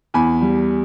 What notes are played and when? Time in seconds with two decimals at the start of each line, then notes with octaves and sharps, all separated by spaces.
0.14 E2 G#5 B5
0.42 G3